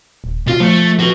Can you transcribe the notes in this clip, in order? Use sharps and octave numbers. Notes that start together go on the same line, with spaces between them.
D#1
B2 F4
F3 A3
F#4 B4